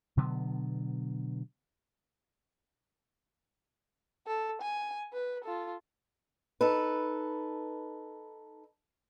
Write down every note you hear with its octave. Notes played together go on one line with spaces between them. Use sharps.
B2 D3 F#3 B3
A4
G#5
B4
F4 A4
D#4 A4 B4